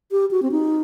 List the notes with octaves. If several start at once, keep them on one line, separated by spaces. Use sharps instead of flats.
G4
F#4
C4
D#4